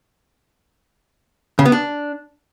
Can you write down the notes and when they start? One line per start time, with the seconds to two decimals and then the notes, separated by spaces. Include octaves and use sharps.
1.59 C#3
1.65 B3
1.72 D4